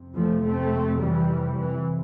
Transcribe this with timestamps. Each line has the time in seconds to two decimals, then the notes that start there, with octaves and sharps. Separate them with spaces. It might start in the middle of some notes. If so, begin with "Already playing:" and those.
Already playing: F2 C3
0.14 F3 A3
0.42 A3 C4
0.99 E3 G3
1.55 E3